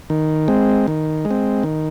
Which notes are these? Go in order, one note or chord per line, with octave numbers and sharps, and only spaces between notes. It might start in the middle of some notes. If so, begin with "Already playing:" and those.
D#3
G#3 C4
D#3
G#3
C4
D#3